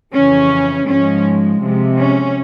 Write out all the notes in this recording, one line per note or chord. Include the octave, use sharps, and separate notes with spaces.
F2 C#3 E3 C#4
G#2 F3 G#3 C#4
C3 F3 G#3
C#4